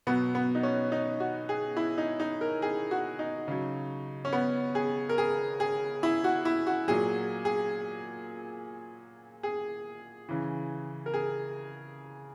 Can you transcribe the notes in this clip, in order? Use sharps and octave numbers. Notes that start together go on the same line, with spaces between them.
B2 F#3 B3
B3
D#4
C#4
D#4
F#4
G#4
E4
D#4
D#4
A#4
G#4
F#4
D#4
C#3 F#3
C#4
B3
G#4
A#4
G#4
G#4
E4
F#4
E4
F#4
A#2 F#3 G#4
G#4
G#4
C#3 E3
A#4
G#4